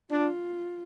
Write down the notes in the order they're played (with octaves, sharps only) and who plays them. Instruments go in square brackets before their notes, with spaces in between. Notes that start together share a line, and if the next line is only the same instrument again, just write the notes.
[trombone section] D4 [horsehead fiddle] F4